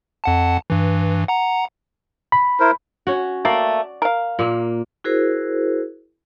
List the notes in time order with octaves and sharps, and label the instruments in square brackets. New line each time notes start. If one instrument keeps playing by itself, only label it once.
[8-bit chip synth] F2 F#5 A5
G2 E3
F#5 A#5
[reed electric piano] B5
[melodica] E4 A#4 C5
[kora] C#4 F#4
[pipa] A3 A#3 [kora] D5
[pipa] A#4 F5
[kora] A#2 A#3
[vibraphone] E4 F#4 G#4 A#4 C5